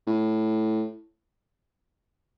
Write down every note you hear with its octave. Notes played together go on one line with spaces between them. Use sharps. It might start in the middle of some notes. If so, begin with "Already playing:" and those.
A2